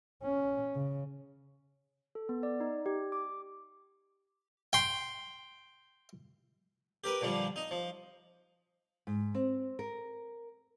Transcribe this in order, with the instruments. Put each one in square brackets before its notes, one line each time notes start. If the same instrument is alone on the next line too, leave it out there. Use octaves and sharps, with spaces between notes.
[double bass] C#4
C#3
[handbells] A4
B3
D5
D#4
G4
D6
[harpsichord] G5 C6
G4 A#4 B4
A#2 D3 F3 G3
D#4
F3
[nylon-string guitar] G#2
C4
A#4